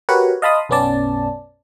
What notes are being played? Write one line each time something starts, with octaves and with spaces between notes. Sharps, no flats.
F#4 G4 A#4 B4 C#5 F#5
D#5 F5 A5 B5 C6 D#6
B1 F#2 B3 C#4 D5 A5